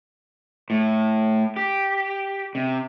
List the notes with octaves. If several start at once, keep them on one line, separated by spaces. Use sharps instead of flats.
A2
G4
C3